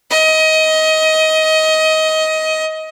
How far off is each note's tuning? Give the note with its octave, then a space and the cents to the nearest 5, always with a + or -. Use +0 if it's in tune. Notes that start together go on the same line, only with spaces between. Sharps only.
D#5 +20